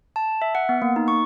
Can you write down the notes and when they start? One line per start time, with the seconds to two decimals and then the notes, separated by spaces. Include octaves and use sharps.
0.16 A5
0.42 E5
0.55 F#5
0.69 B3
0.82 A#3
0.96 D#4
1.08 C#6